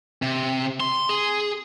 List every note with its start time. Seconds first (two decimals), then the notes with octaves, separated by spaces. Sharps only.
0.22 C3
0.80 C6
1.09 G#4